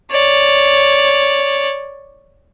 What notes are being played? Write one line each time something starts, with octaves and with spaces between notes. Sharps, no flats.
C#5 D5